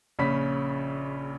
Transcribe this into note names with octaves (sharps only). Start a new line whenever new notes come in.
A#1 C#3 C#4 B5 B6